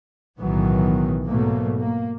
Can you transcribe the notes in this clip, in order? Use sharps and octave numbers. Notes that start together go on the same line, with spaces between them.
B1 A2 D#3 E3 F#3 B3
G#2 B2 F#3 A3 A#3
A#3